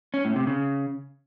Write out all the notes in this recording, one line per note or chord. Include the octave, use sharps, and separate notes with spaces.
C#4
A2
C3
C#3